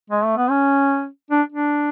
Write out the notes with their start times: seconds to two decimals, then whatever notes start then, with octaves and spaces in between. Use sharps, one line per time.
0.10 G#3
0.24 A3
0.37 B3
0.50 C#4
1.31 D4
1.52 D4